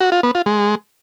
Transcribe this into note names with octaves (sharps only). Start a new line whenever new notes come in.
F#4
F4
B3
F4
G#3